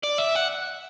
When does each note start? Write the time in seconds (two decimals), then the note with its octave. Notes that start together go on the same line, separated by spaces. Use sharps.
0.04 D5
0.18 E5
0.35 F#5